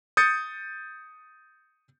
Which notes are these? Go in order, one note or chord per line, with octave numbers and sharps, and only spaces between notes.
D#6 G6 A6 C#7